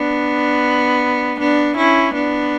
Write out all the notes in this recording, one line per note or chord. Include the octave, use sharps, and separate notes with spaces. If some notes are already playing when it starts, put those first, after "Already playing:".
Already playing: B3 D4
B3 D4
C#4 E4
B3 D4